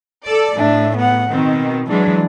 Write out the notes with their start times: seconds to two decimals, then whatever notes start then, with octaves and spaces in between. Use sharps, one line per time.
0.25 A4 D5
0.57 A2 D4 E5
0.97 B3 F#5
1.30 B2 D#3 C4
1.88 E3 F#3 G#3 D4